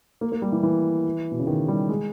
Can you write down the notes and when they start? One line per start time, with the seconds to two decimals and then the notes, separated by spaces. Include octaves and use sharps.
0.21 A#3
0.32 A#3
0.42 G3
0.52 E3
0.63 E3
1.32 B2
1.39 C#3
1.47 D#3
1.68 G3
1.89 G#3